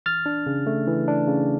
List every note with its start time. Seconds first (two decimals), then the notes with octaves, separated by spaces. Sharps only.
0.06 E3 F6 A6
0.26 D4
0.46 C#3
0.66 A3
0.87 E3
1.08 D4
1.28 C#3